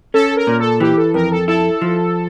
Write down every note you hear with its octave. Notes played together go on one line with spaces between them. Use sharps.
C#4 A4
A#4
A#2
A4
E3 G4
A4
F2 A#4
A4
E4 A4
F3